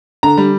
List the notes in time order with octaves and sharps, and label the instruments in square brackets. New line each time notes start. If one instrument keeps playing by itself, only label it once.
[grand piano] D3 A#5
G3